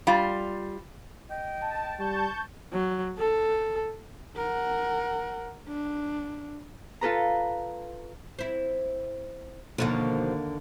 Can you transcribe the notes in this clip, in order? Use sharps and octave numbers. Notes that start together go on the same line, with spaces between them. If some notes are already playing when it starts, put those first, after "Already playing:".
G3 F4
D#5 G5
A5
G3 A5 C#6 G6
F#3
A4
A#4 F#5
D4
F4 A4 B4 A#5
C4 E4
D#2 B2 D3 D#3 F3 A#3